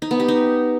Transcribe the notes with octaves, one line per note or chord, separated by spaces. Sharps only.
D#4
B3
G4
D#4